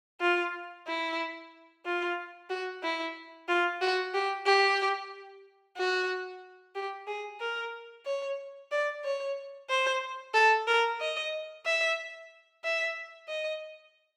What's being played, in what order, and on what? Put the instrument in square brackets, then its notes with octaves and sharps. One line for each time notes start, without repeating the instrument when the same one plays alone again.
[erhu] F4
E4
F4
F#4
E4
F4
F#4
G4
G4
F#4
G4
G#4
A#4
C#5
D5
C#5
C5
A4
A#4
D#5
E5
E5
D#5